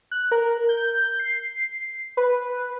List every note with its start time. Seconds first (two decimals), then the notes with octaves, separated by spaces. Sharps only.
0.11 F#6
0.32 A#4
0.69 G6
1.20 C7
2.17 B4